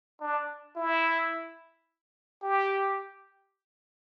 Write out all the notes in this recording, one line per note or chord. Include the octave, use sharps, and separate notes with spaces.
D4
E4
G4